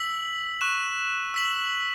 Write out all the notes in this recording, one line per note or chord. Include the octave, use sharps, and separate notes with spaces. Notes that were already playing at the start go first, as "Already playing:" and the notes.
Already playing: E6 B6 F#7
C#6 F#6 E7
E6 B6 F#7